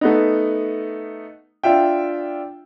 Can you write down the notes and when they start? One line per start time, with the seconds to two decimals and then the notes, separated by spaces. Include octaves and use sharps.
0.01 A3 B3 D#4
1.63 D4 F4 E5 G5